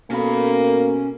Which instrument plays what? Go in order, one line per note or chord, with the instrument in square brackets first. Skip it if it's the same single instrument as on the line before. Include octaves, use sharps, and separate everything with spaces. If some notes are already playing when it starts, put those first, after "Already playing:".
[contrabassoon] B2 [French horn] A#3 [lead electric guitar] C#4 B5 [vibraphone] A4 A#4